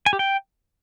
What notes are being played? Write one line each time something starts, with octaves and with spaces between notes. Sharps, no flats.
G#5
G4
G5